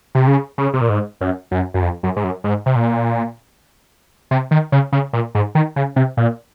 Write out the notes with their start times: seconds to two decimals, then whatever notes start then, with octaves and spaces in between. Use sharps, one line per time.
0.15 C3
0.27 C#3
0.58 C#3
0.74 C3
0.81 A#2
0.89 G#2
1.21 F#2
1.51 F#2
1.74 F#2
1.82 F2
2.03 F#2
2.16 G#2
2.24 F#2
2.44 G#2
2.66 C3
2.76 A#2
4.31 C3
4.51 D#3
4.72 C#3
4.92 C#3
5.13 A#2
5.35 G#2
5.55 D#3
5.76 C#3
5.96 C3
6.17 A#2